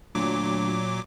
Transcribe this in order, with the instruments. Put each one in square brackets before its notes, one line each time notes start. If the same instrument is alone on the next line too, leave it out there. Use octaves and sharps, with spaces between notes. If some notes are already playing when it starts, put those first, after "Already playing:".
[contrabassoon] D2 [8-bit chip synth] A#2 F#3 D6